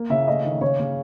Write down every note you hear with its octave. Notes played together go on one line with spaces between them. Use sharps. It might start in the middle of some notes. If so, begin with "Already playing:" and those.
Already playing: A#3
C#3 E5
A3 D#5
D#3
C#3 C#5
C#3